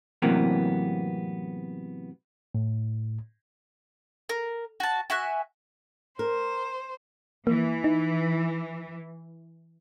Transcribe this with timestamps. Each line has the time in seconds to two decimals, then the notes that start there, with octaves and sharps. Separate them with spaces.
0.22 A2 C3 E3 F#3 A#3 B3
2.55 A2
4.29 A#4
4.80 F#4 A5
5.10 F#4 E5 G#5 F#6
6.19 A#4 C5
7.47 E3 A#3
7.84 D#4